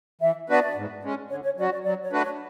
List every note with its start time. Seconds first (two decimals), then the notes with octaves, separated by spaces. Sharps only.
0.21 E3 E5
0.49 B3 D4 F#4 B4 D5
0.76 G#2
1.03 G#3 C#4
1.30 D3 C#5
1.44 C#5
1.57 F#3 C#4 F#4 D5
1.71 D5
1.84 F#3 D5
2.03 C#5
2.12 A3 D4 F#4 B4
2.21 C#5